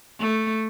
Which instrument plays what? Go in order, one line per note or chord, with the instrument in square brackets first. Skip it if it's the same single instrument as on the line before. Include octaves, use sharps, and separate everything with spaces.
[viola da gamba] A3